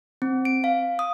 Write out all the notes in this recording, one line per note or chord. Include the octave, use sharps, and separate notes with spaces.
C4
D7
F5
D#6